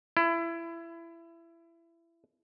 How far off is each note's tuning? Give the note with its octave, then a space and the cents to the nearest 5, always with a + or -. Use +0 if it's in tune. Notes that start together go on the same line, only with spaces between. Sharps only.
E4 +25